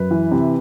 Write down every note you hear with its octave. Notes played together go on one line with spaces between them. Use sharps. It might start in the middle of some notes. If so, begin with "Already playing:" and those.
Already playing: F#2 B4
E3
C3